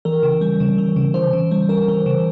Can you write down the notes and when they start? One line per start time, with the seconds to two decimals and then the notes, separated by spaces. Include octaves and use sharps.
0.05 E3 A#4
0.23 C#3
0.41 G3
0.60 C#3
0.78 E3
0.96 C#3
1.14 E3 C5
1.33 C#3
1.51 G3
1.69 C#3 A#4
1.88 E3
2.06 C#3